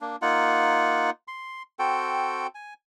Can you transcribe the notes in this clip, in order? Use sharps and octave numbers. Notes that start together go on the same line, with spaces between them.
A#3 D4
A#3 D#4 F4 F#5
C6
C4 F#4 A4 G5
G#5